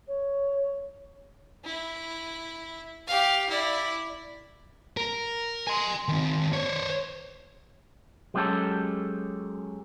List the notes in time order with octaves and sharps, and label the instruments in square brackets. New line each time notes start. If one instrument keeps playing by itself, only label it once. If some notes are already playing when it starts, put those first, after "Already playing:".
[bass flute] C#5
[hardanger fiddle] E4
G4 F5
E4 D5
[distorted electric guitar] A#4
G#5 C6
D#3 C4
C5 C#5
[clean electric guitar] F#3 G#3 B3 C#4 G4 A4